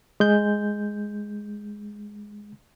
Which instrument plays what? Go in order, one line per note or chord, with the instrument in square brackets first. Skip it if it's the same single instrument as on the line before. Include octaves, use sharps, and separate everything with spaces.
[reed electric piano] G#3 G6